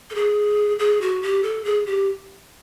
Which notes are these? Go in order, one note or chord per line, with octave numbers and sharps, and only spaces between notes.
A4
G#4
G#4
F#4
G4
A4
G#4
G4